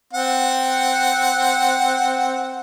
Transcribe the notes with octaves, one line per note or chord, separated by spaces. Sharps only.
C4 F#5